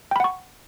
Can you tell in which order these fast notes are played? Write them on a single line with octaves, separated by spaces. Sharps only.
G5 B5 F#5 C#6